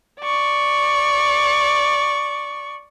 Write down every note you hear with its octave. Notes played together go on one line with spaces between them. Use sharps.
D5 C#6